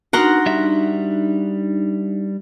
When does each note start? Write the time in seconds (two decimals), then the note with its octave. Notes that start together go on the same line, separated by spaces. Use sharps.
0.13 D4 D#4 F#4 A#4 F#5 A#5 C6
0.46 G3 E5